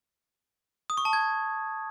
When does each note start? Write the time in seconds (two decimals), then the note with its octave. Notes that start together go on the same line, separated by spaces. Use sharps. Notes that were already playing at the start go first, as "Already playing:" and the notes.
0.90 D#6
0.97 C#6
1.05 A5
1.13 G#6